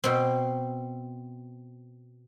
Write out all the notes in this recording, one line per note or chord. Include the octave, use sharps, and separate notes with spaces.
B2 C4